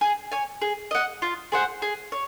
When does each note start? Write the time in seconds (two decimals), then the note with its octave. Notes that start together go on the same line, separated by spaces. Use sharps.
0.01 G#4
0.32 C#5 G#5
0.62 G#4
0.91 D#5 F#5
1.22 F4
1.52 G#4 C5 F#5
1.82 G#4
2.12 C#5